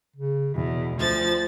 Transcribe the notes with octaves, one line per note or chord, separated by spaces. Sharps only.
C#3
E2 B2
D2 F3 A6